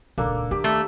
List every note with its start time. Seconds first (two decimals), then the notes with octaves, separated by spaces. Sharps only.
0.18 D#1 C#2 A#3 D4 A4
0.51 D#2 G4 D5
0.64 A3